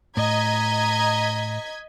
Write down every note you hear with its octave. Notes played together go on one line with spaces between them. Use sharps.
A2 D#5 A#5 G#6 B6